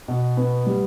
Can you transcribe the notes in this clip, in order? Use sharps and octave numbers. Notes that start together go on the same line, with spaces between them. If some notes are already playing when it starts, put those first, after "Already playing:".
B2
B3
G3